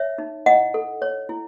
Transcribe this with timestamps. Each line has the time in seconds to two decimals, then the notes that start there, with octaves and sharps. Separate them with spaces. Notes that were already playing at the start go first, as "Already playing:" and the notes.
Already playing: C#5 E5
0.18 D#4
0.46 E4 D#5 F#5
0.74 A4
1.02 C#5
1.29 E4